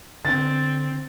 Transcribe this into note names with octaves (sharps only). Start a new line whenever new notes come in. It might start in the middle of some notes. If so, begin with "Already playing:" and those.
D3 C4 A6